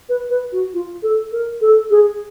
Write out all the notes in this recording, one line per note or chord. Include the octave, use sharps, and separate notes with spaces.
B4
B4
F#4
F4
A4
A#4
A4
G#4